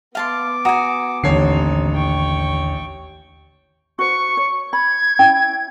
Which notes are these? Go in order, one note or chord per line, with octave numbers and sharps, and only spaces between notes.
B3 F5 A5 C6 D6
F#4 G#5 A#5 D#6
A1 D#2 D3 C4 D#4 C#5 C7
G5 C#6
F#4 C5 C#6
C#5
B5 G#6
C#4 E4 G5